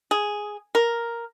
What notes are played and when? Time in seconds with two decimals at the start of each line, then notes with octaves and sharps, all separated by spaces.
0.11 G#4
0.75 A#4